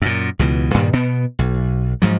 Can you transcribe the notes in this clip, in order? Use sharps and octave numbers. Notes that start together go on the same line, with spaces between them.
F#2 A#2
C#2 B2 E3
G2 A#2 D#3 G3
B2 B3
B1
G#2 F3 F#3